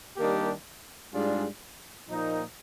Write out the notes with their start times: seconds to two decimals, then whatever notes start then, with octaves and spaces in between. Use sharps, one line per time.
0.17 D#3 G3 A#3 D4 G4
1.12 G#2 G3 D4 F4 G#4
2.07 A#2 F3 A#3 D#4